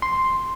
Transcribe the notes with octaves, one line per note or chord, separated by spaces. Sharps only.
C6